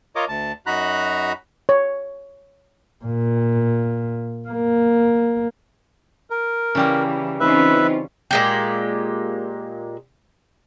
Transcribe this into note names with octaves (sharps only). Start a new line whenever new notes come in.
F4 A#4 C#5 D#5 D6
D2 A5
F#2 D#4 F#4 A#5 B5 F#6
C#5
A#2
A#3
A#4
C#3 E3 G3 A#3
E3 C4 C#4 D#4 F4 B4 E5
A#2 G#3 G4